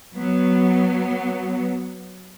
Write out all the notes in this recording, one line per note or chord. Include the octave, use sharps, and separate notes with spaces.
F#3 B3